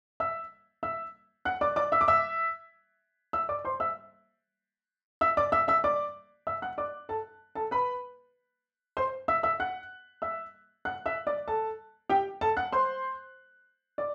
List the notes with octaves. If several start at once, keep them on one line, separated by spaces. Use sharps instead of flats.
E5 E6
E5 E6
F#5 F#6
D5 D6
D5 D6
E5 E6
D6
E5 E6
E5 E6
D5 D6
C5 C6
E5 E6
E5 E6
D5 D6
E5 E6
E5 E6
D5 D6
E5 E6
F#5 F#6
D5 D6
A4 A5
A4 A5
B4 B5
C5 C6
E5 E6
E5 E6
F#5 F#6
E5 E6
F#5 F#6
E5 E6
D5 D6
A4 A5
G4 G5
A4 A5
F#5 F#6
C5 C6
D5 D6